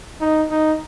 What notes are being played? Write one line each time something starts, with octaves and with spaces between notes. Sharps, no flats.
D#4
D#4